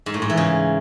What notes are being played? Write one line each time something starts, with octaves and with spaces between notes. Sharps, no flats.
G#2
A2
G#2
E3
C#3